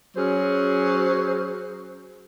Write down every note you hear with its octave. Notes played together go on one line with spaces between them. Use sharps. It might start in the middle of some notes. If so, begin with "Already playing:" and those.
F#3 C#4 G#4 C5